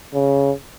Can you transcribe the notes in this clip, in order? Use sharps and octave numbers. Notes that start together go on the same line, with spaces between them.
C#3